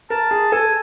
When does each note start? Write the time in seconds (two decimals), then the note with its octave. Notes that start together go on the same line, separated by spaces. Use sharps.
0.10 A#4 A5
0.31 G#4
0.52 A4 G#5